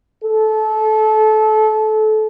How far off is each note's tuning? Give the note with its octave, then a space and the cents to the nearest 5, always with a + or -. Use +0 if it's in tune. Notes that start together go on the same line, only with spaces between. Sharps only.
A4 -25